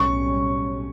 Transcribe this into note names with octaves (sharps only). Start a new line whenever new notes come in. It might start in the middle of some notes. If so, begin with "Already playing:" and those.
Already playing: B1 A2 G3 C#4 C#6